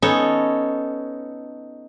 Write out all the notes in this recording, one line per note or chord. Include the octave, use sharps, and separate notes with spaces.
B3 C#4 D#4 A4 C#5